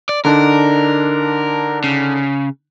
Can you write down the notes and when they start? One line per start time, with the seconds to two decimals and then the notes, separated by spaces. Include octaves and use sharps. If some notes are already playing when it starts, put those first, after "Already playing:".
0.09 D5
0.25 D3 D4 D#4 A#4
1.84 C#3